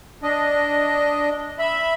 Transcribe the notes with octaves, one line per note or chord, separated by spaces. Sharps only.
D4 D#5
E5 B5